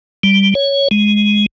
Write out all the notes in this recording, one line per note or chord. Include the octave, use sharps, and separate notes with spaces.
G3
C#5
G#3